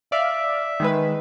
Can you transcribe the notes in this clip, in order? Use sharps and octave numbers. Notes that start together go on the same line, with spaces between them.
D5 E5 F5
D#3 G#3 B4